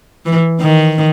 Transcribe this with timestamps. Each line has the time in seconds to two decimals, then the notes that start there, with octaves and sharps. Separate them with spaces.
0.26 E3
0.61 D#3